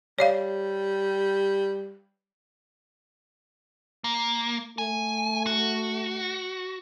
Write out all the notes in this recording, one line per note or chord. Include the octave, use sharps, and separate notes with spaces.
G3 C#5 D5 F5
A#3
A3 G#5
F#4